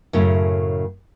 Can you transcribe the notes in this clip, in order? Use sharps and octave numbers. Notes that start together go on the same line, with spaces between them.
F#2 A2 C#3 A3